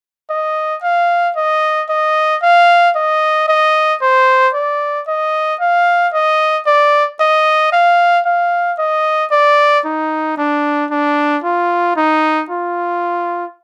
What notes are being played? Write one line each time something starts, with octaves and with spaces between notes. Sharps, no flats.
D#5
F5
D#5
D#5
F5
D#5
D#5
C5
D5
D#5
F5
D#5
D5
D#5
F5
F5
D#5
D5
D#4
D4
D4
F4
D#4
F4